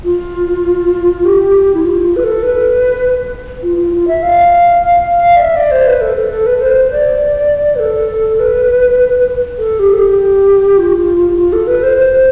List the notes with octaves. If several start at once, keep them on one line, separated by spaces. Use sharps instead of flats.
F4
G4
E4
F4
F4
B4
A4
B4
F4
F4
F4
E5
F5
F5
F5
D5
E5
D5
C5
B4
A4
A4
A4
B4
C5
D5
B4
A4
B4
A4
G4
A4
G4
F4
F4
F4
F4
A4
B4
C5
C5